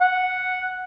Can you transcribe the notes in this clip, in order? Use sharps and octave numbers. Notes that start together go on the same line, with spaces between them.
F#5